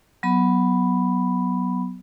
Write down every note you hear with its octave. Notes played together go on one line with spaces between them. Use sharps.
F#3 B3 B5